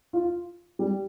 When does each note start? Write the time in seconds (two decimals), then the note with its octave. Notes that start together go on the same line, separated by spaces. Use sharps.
0.13 F4
0.79 G3